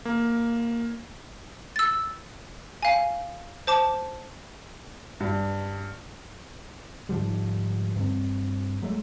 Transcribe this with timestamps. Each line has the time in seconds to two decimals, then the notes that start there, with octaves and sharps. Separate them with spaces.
0.05 A#3
1.76 E6 A6
2.83 F5 G#5
3.67 C5 A5 D6
5.20 G2
7.09 G#2 D3 F3 G3
7.96 G2 C4
8.82 F#3 G#3 A3